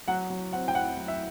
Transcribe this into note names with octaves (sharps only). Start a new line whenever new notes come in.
F#3 F#5
F#3
C4 F#5
G5
E4 F#5
F#3
E5